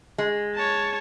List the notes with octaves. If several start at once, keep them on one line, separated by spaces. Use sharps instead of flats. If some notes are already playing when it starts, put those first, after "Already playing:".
G#3
C#5 A5